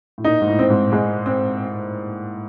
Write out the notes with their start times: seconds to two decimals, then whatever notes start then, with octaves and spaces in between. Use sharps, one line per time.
0.18 A2
0.24 A#2 D#4
0.41 G#2
0.47 A2
0.59 C4
0.70 G#2
0.92 G#2 G#3
1.26 C4